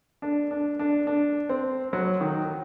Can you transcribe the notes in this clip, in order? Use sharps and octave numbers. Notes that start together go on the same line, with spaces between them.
D4
D4
D4
D4
C4
F#3
D#3